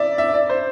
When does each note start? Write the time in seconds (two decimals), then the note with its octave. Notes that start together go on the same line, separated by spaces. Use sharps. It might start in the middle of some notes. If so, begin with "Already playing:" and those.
Already playing: D5 E5
0.18 E5
0.34 D5
0.49 C5